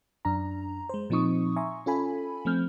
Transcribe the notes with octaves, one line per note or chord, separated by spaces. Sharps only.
F#2 D4 A#5
G#3 C5
A#2 F3 C4 D#4 C#6 D#6
E5 G#5 A#5 C6 C#6
C#4 F4 A4 G#5 B5
F3 A3 C4 F6 G6